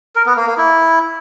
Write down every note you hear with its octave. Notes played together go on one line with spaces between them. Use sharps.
A#4
B3
A#3
A#3
E4